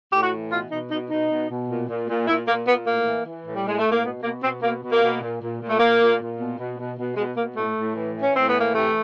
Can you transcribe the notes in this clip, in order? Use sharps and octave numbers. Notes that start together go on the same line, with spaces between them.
A2 G4
F#4
E3
B2 F4
B2 D#4
B2 D#4
B2 D#4
B2
B2
A#2
A#2
A#2
A#2 E4
A#2 A#3
A#2 B3
A2 A#3
E3
E3
A2
G3
A2 G#3
A3
A2
A#3
B2 B3
B2 A#3
B2 C4
B2 A#3
B2
A#3
B2
A#2
A#2
A#2
A3
A#2 A#3
A#2
A#2
B2
B2
B2
B2
B2 G#3
B2 A#3
A2 A3
A2
E3
E3
C#4
A2 C4
B3
E3
A#3
C3 A3